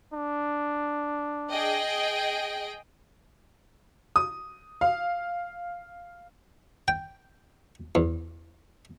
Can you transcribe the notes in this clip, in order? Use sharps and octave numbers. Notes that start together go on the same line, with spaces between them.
D4
G#4 D#5 G5
D#6
F5
G5
E2